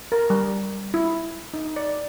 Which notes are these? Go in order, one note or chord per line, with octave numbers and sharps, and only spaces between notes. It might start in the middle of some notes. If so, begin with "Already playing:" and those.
A#4
G3
E4
D#4
D5